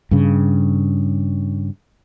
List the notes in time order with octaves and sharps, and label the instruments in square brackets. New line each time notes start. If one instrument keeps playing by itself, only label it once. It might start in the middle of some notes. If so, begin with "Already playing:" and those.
[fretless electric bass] G2 C#3